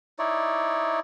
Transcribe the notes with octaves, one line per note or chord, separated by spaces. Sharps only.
D#4 E4 C#5 D5